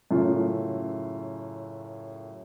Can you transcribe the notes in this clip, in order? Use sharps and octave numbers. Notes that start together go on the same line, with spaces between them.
F#2 A2 C#3 A3 F4